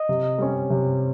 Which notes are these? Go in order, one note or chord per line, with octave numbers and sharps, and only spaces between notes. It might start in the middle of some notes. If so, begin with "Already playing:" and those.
Already playing: D#5
C3
G3 C#4
C3